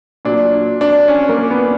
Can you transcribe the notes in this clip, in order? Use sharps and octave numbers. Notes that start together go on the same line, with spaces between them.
A#2 F#3 D4
D4
C#4
A#3
B3